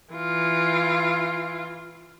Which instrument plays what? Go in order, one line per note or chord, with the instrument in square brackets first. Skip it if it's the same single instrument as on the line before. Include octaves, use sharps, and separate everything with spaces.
[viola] E3 F4